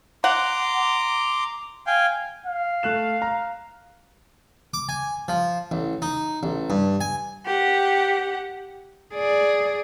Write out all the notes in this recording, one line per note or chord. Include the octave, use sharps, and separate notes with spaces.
F#5 A#5 C6 D6
F5 G5 G#5
F5
A3 F#6 E7
A#5
D6
G#5
F3
A1
D#4
A1
G2
G#5
G4 F#5
G#4 D5